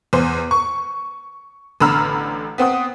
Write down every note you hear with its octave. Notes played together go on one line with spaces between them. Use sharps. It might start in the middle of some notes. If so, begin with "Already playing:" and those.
E2 C5
C#6
A1 D3 A#5 B5 E6 F6
B3 C4 F#5 D#6